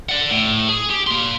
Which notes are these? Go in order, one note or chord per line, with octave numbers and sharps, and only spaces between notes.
D5 F#5
A2
G#4
G4
A#3 C6